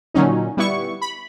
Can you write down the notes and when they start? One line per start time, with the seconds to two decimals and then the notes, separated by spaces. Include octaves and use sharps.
0.14 A#2 D3 F#3 C#4 D#4
0.57 G3 B3 E4 C#6
1.02 B5